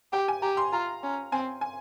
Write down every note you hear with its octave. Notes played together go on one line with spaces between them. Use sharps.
G4 G5
G#5
G4 A#5
C6
F4 A#5
C#4
C4 G#5
G#5